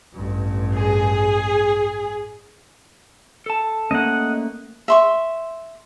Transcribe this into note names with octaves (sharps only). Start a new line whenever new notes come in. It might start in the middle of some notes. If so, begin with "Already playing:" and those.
A1 G2
G#4
A4 A5
A3 A#3 C#4 D#5 F#5
E5 C6 C#6